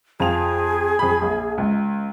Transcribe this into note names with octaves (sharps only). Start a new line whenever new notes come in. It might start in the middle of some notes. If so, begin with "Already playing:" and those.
F2 F4 G#4 F7
F2 B5
A#1
C#2